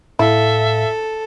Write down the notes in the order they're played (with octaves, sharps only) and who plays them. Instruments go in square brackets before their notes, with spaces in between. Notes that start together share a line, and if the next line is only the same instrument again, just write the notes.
[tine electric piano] A2 F5 [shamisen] E4 [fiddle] A4 [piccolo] E5